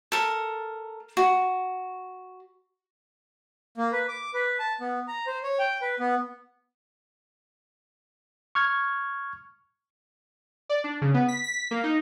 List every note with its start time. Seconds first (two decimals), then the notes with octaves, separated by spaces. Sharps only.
0.12 A4 A#4
1.17 F#4
3.77 A#3
3.92 B4
4.08 D6
4.34 B4
4.59 A5
4.81 B3
5.08 A#5
5.26 C5
5.43 C#5
5.59 G5
5.82 B4
5.99 B3
8.55 C#6 F6 G#6
10.69 D5
10.84 D4
11.01 C#3
11.14 B3
11.28 B6
11.44 B6
11.71 A#3
11.84 D#4